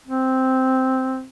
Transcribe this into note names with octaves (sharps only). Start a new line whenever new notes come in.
C4